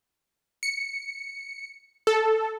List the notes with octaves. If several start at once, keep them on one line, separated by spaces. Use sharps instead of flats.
C#7
A4